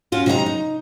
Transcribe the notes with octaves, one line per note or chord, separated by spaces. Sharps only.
C#4 F4 F#4
C3 D#4 C#5 A#5
D#4